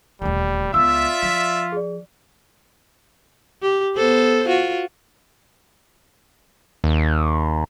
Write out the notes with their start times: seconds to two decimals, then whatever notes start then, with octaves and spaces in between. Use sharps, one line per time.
0.22 D#1 D2 G3
0.74 C#2 B3 F4 D5 E5 E6
1.23 F3 B6
1.72 G#4 D5
3.62 G4
3.96 B3 A4 C5
4.47 F4 F#4
6.84 D#2